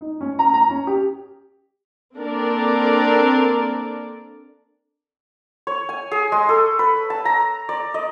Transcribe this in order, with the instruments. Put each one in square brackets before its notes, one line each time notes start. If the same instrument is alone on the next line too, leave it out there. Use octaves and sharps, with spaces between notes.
[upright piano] D#4
C#4
A#5
A#5
C#4
G4
[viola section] A#3 C4 D4 A4 A#4 D5
[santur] C#5
G#5
G#4
G#3
A4
B4
A5
A#5
D5
D#5